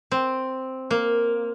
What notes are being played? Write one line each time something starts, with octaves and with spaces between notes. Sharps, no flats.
C4
A#3